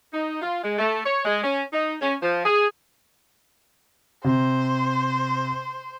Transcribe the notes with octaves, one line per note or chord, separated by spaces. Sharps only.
D#4
F4
G#3
A3
C#5
G#3
C#4
D#4
C#4
F3
G#4
C3 C5